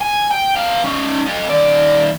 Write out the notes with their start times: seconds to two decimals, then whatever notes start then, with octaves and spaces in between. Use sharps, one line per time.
0.01 G#5
0.31 G5
0.56 B3 F5
0.84 C#4 D#4
1.26 A4 D#5
1.49 D#2 D5